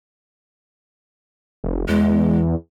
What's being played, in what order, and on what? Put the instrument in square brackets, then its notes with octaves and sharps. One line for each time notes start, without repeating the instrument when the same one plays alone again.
[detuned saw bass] F1
[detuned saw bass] E2 [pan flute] G#3